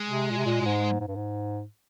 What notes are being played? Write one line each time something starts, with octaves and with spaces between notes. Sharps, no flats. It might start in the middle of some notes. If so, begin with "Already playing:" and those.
Already playing: G#3
C3
A#2
C3
A#2
A#2
G#2
G#2
G2
G#2